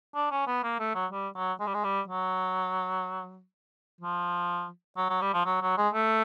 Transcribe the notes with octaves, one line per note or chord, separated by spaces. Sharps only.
D4
C#4
B3
A#3
A3
F#3
G3
F#3
G#3
G3
G#3
G3
F#3
F3
F#3
F#3
G3
F3
F#3
F#3
G#3
A3